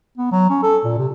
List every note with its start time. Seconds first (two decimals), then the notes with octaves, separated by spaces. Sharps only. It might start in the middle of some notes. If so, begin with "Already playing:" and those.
0.18 B3
0.32 F#3
0.50 C#4
0.63 A4
0.84 A#2
0.98 C3